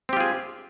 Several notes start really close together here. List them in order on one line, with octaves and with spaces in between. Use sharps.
C4 G4 F4 G#4